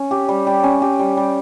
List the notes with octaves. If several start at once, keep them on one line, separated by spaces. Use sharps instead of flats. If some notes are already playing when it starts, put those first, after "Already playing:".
Already playing: C#4
G4
G3
G3
C#4
G4
G3
G3